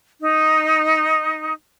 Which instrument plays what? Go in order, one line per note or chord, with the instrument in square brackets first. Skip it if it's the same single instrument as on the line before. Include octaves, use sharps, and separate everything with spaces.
[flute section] D#4